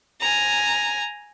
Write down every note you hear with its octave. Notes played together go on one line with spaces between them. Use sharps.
G#5 A#5